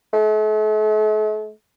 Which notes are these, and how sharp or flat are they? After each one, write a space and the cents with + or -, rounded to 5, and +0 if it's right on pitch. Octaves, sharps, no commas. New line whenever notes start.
A3 -45